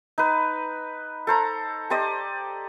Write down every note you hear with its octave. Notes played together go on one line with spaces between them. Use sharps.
D#4 B4
A4 C5 A#5
G4 C5 D5 D#5